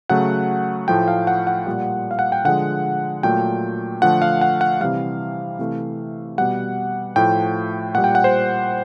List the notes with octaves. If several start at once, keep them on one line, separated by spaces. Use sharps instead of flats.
C#3 F#3 A3 F#5
A2 F3 A3 G5
F5
F#5
F#5
A#2 G3
F5
F#5
G5
D3 F3 G#3 F#5
A#2 F#3 A3 G5
D3 F3 A3 F#5
F5
F#5
F#5
C3 E3 G3 F5
C3 E3 A3
B2 G3 F#5
A2 F3 A3 G5
A#2 G3 F#5
G5
F#5
C5